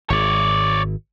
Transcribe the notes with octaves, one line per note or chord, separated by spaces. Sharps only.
G#1 C#5 D5